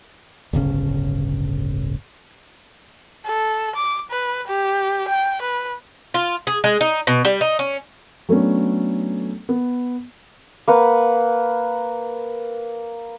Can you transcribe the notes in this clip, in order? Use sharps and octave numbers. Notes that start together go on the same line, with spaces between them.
D1 G1 C#3 C#4
A4
D6
B4
G4
G5
B4
F4
G#4
G#3
D#4
B2
G3
D#4
C#4
F#3 A3 B3 C#4 D4
B3
A#3 B4 F#5